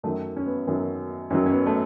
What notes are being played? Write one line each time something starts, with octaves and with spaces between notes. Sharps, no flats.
F#2 D#3 F#3 A3
C#4
B3
F#2 D#3 F#3
F#2 D#3 F#3 C#4
C#4
B3
A3